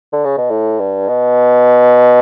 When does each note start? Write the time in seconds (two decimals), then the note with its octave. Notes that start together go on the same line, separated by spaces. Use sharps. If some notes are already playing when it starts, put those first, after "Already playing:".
0.13 D3
0.24 C#3
0.37 B2
0.50 A2
0.79 G2
1.08 B2